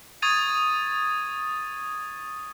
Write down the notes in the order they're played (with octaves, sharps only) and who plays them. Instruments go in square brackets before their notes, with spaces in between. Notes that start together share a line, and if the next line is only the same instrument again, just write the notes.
[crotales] C#6 D#6 G#6 A6 D#7